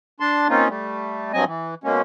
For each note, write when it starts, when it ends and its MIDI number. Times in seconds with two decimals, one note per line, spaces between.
0.20 0.48 62
0.20 0.48 81
0.20 0.48 84
0.49 0.68 58
0.49 0.68 60
0.49 0.68 61
0.49 0.68 63
0.49 0.68 65
0.69 1.32 55
0.69 1.32 57
1.33 1.45 43
1.33 1.45 54
1.33 1.45 60
1.33 1.45 75
1.33 1.45 80
1.46 1.75 52
1.84 2.02 47
1.84 2.02 56
1.84 2.02 58
1.84 2.02 61